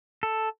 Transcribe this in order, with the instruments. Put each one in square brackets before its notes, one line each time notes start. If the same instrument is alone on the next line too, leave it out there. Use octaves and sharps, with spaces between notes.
[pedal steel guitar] A4